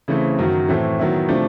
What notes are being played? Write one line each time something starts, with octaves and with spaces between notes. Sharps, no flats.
C#3 E3 A3 C4
F#2 D#3 F#3
A2 E3 A3 C4
D#3 F#3 B3 E4
C3 F3 A3 D4